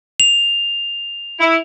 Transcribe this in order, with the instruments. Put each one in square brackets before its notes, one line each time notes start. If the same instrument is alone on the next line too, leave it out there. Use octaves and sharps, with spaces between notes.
[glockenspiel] F7
[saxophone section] E4